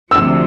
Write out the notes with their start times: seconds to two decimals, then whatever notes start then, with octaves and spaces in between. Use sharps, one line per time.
0.11 D2 C3 F3 E6